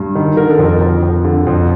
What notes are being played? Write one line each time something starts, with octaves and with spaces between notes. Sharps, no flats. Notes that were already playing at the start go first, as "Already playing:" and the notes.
Already playing: G2
D#3
D3 A#4
A4
F2 A#4
F2
F2
D3
F2